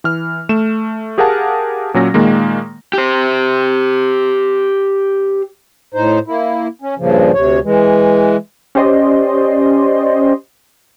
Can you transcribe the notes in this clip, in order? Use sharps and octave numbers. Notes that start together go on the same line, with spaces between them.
E3 F6
A3 E7
G4 G#4 A#4 F5 F#5 A5
A#2 F#3 C#4 A#6
A#2 D#3 G#3 A#3
G4 C5
A2 D#4 C5
A#3 E4
C#4
G2 A#2 C#3 F3
D2 C3 C#5
E3 G#3
C#4 G4 C5 D5 D#5 C6